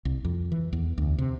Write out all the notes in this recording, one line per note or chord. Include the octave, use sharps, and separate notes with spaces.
C2
F2
E3
E2
D2
C3